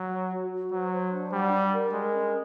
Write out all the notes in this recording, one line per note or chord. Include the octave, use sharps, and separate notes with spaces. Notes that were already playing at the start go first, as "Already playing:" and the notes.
Already playing: F#3
C#5
F#4
F#4
F#3 C5
C5
D4
G3 F#5
D5
A#4
G#3 A#4
C#4